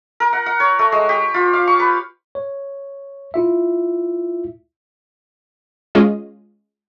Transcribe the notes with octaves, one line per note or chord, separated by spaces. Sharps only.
A#4
F#5
F#5
C#5
A3
G#3
G4
F4
F5
C#6
B4
C#5
E4 F4 E5
G#3 C#4 F4 G#4 D#5